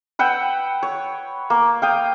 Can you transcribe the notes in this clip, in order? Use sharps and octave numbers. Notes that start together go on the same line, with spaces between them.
B4 F#5 G5 E6
C#5
A#3
F5 G5 D#6